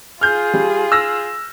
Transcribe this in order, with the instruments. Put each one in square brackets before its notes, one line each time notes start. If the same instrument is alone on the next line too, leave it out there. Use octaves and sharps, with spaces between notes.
[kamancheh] F4 G#4 [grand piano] F6 G6
[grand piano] G3
E6 F6 A#6